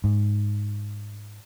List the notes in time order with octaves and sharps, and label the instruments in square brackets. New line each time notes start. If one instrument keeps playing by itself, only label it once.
[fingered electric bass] G#2